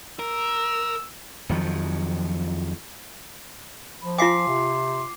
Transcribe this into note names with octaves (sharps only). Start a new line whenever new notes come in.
A#4 E6
F2 D#3 F3 F#3
F3 B5
F4 F5 G#5 C6 D6 C7
C3